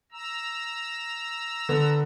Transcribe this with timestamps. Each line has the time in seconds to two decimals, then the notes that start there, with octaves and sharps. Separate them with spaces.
0.12 A#5 E6
1.69 D3 B3